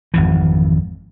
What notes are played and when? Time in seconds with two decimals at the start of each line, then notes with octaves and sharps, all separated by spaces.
0.14 G#1 F2 E3